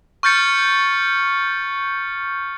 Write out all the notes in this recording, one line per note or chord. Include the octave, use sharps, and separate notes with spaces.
C#6 F6 G6 A6 C#7